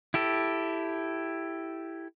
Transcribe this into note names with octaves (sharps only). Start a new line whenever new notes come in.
E4 G4 A4